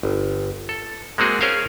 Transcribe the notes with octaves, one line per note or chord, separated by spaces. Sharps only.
G1
A4
G#3 A#3 C4 F#4 G#4
C#4 G#4 A#4 C5 C#5 F5